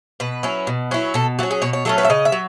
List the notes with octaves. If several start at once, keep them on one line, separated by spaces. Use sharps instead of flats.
B2 B4
F#3 C#4 E4
B2
F#3 C#4 E4
B2 A4
F#3 A3 C#4 F#4
G#4
B2 C#5
C#5
F#3 A3 C#4 A4
B4
E5
C#3 D#5
E5
F#3